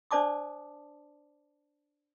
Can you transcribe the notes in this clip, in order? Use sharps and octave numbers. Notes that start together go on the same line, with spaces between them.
D4 C5 D5 A5 D6 D#6